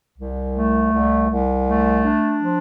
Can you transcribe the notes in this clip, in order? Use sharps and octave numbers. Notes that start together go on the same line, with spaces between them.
C2
A3
C2
C2
A3
D4
F3